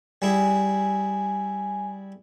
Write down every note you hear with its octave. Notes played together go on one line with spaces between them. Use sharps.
G3 E4 G#4 G#5